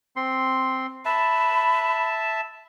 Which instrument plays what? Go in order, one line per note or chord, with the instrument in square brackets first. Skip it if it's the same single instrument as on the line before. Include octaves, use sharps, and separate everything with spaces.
[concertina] C4 C6
[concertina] E5 A5 [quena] B5